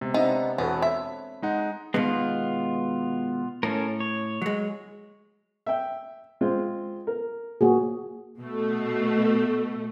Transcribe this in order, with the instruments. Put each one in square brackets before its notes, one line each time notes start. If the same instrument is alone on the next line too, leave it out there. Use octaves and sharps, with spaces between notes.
[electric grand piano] C3 [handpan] G#3 B3
[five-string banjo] B3 D#4 [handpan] C4 D4 E5
[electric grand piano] E2 B2 [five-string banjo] B3 [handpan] A4 B4 C#5
[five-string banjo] E5 [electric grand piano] B6
[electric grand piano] G#3 D#4 F#5
[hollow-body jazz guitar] B2 D#3 G#3 [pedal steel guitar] B3 F4
[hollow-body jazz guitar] A2 [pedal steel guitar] C#4 A4 A#4
[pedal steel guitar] C#5
[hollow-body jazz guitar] F#3 G#3
[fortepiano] E5 G5
G#3 C4 F4
A#4
[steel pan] A#3 F#4 G#4
[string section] B2 A3